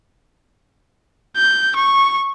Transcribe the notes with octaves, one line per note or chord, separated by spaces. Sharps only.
G6
C#6